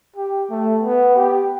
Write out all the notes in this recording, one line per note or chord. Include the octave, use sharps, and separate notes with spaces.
G4
A3
B3
G4